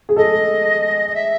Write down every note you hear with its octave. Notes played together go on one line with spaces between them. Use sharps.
G#4
A4 D#5
D#5
E5